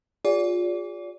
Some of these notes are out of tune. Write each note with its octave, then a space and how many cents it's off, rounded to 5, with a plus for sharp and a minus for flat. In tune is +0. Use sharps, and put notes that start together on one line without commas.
F4 +25 G#4 -25 D5 -30